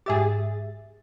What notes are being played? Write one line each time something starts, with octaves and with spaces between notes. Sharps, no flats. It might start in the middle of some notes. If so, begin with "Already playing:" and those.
G#2 G4 G#4 E5 A6